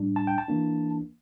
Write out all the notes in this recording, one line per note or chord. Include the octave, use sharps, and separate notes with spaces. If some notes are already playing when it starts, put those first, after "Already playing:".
Already playing: A2 G3 D4
A5
G5
A5
E3 A#3 D4